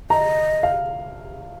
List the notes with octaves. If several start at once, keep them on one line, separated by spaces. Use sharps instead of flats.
D#5 A#5
F5